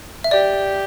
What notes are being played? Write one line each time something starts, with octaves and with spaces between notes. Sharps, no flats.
E5
G4 D5